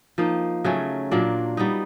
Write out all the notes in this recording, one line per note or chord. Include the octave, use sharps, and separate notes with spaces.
F3 A#3 D#4
C#3 F#3 A3 C#4
A#2 F#3 A#3 D4
G3 B3 D#4